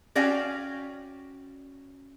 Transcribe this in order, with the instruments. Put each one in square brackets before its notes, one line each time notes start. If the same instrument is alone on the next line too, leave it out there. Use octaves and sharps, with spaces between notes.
[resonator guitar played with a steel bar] C#4 F#4 D5 F5 G5 G#5